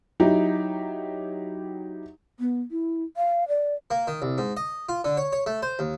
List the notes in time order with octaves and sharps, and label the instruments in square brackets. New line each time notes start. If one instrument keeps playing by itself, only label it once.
[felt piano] F#3 D#4 E4 G4
[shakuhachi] B3
E4
F5
D5
[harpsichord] A#3
D#3
C2
G#2
D#5
F4
D3
C#5
C#5
A3
C5
D#2